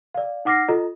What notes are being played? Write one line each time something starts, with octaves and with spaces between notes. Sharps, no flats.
D5 F5
D#4 F#5 D6 F6 A#6 C7
F4 A4 D#5 A#5